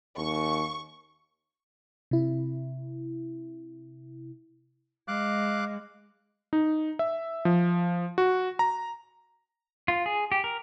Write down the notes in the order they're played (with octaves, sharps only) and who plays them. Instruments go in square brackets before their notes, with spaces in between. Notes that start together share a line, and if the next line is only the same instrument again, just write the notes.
[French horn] D#2 [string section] C#6
[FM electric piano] C3 E4
[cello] G#3 [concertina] F5 D6 F#6
[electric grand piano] D#4
E5
F3
F#4
A#5
[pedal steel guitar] F4
G#4
G4
A#4